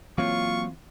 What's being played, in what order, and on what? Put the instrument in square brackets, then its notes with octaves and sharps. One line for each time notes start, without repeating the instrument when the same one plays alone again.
[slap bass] E3 C4 [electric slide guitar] F#3 A#3 C#5 [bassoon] F4 [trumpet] C#6